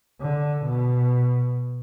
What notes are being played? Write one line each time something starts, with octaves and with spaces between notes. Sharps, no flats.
D3
B2